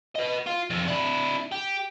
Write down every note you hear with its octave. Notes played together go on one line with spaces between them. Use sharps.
B4 D#5
F4
F2 C3
D4 E4
G4